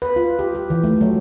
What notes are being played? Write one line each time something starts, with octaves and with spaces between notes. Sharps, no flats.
B4
F4
G4
G4
E3
A3
F#3